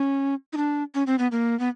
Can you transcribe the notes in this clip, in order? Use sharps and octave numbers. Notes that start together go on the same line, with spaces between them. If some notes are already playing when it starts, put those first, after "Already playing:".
Already playing: C#4
D#4
D4
C#4
C4
B3
A#3
B3